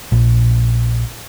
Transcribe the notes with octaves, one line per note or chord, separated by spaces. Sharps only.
A#1